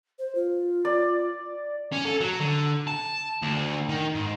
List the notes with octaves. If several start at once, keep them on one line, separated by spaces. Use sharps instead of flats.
C5
F4
D5
C#4
A4
F#3
D3
A5
D2
D#3
G#2